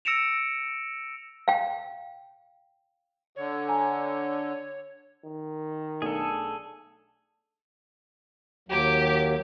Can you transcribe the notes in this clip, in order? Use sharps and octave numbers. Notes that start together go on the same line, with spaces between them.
E6 A#6 C#7 D7 E7 F7
F5 G5
D3 C#5
G#5 A#5
D#3
B1 A3 D4 G#4 A4
D#2 F#3 G4 D6